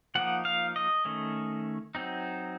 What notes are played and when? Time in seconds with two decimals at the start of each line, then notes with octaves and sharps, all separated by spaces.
0.15 F3 A#3 D#4 F#5
0.45 F5
0.76 D#5
1.05 D#3 A3 C#4
1.95 F#3 C4 D#4